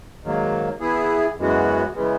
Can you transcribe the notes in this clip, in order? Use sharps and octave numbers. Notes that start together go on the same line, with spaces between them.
G#2 D#3 F#3 A#3
E3 B3 E4 G#4
F#2 E3 G#3 B3 F#4
C#3 E3 G#3 B3